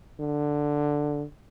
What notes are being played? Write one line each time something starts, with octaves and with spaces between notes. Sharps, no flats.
D3